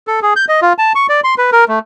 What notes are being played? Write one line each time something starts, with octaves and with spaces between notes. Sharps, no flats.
A4
G#4
G6
D#5
F4
A5
C#6
D5
C6
B4
A#4
A3